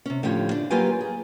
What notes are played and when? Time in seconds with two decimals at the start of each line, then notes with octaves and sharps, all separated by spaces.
0.06 C3 C#4
0.23 A2 D3 F3 G4 C#5
0.51 D4
0.70 F#3 A#3 F4 G4 B4 G#5
1.01 G#4